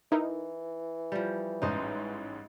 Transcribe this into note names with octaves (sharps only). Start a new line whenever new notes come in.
E3 D#4 E4 A#4
F3 G3
A1 G#2 C#4 D#4 C5 D#5